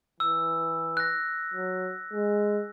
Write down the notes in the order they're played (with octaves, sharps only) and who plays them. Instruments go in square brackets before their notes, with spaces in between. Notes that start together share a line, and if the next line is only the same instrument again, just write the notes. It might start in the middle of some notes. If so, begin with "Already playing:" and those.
[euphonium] E3 [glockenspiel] E6
[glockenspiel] F#6 A#6
[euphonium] F#3
G#3